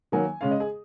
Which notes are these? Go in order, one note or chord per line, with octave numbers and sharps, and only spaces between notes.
D#3 F#3 A#3 G#5
C#3 G#3 C#4 F5
D#5
G#4